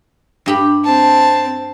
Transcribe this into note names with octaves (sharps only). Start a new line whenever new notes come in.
G2 G4 B5
C4 A5